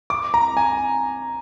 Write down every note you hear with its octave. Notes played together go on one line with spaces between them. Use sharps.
D6
A#5
G#5